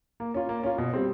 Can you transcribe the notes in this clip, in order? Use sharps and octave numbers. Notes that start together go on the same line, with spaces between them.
A#3
C#4 F4
A#3
C#4 F4
B2
G3 C4